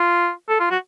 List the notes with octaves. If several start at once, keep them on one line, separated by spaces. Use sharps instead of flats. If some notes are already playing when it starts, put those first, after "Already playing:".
Already playing: F4
A4
F4
F#4